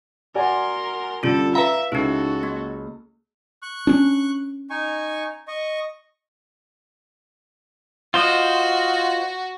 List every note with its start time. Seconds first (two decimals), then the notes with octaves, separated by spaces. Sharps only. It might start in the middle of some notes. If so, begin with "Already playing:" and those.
0.35 F#4 A#4 D5 G#5 C6
1.23 G2 D3 C#4 F4 A4
1.55 B4 E5 F5 A#5
1.92 C#2 D#4 E4 F#4 A4
2.43 A#3
3.62 C#6 F#6
3.87 C#4 D4
4.70 D#4 G#5 C#6
5.48 D#5 C#6
8.14 F4 F#4 C5 D#5